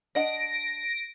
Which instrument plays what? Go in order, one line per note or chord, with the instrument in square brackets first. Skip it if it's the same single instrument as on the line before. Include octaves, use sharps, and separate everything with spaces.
[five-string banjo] D4 D#5 F#5 [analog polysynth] A#6 D7